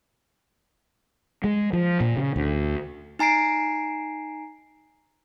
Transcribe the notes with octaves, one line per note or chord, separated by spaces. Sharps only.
G#3
F3
A#2
C#3
D2
D#4 G#5 A#5 C7 D7